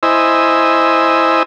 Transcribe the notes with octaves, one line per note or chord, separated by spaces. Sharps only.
E4 C5 D#5 G#5 E6